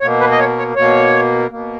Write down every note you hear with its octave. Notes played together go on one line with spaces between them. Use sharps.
B2 A#3 C#5
B4
D#5
C#5
C#5
B2 A#3 C#5
B2 A#3